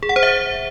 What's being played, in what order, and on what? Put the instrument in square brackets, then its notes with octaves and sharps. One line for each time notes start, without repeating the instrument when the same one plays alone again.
[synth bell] G#4
F#5
C5
E5